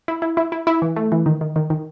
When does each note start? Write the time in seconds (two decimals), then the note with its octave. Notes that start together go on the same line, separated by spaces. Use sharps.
0.08 E4
0.22 E4
0.37 E4
0.52 E4
0.67 E4
0.82 E3
0.96 A3
1.12 E3
1.26 D#3
1.41 D#3
1.56 D#3
1.70 D#3